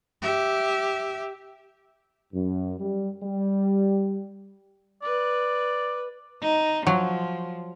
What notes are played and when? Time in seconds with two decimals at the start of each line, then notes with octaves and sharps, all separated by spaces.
0.22 G4 E5
2.32 F#2
2.79 G3
3.24 G3
5.03 B4 D5
6.42 D#4
6.87 F3 F#3